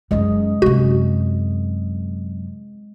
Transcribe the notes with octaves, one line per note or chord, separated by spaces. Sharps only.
F#2 C#3 G#3 D#5
F#2 C3 F#4